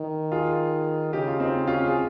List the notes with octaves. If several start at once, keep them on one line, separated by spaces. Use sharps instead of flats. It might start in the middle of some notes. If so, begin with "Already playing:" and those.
Already playing: D#3
F4 G#4
C#3 D#4 G4
F4
C4 D#4
C#4 F4
G#4